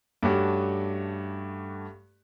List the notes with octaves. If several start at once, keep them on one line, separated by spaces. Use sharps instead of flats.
G2 A3 C#4 F#4 G4